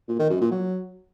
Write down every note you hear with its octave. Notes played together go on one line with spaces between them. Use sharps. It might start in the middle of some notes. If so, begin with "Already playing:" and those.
A#2
D#3
F#2
A#2
F#3